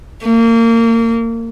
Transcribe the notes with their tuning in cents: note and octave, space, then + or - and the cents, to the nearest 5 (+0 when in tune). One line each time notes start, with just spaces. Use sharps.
A#3 -30